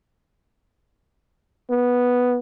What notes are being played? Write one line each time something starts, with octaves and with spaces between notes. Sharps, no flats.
B3